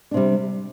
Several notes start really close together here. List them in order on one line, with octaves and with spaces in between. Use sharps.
D4 C3 G3